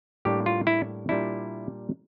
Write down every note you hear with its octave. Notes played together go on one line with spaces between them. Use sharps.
A2 G3 A#3 D4 G4
F4
E4
A#2 G3 D4 E4